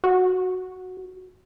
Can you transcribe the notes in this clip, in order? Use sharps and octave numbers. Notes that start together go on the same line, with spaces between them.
F#4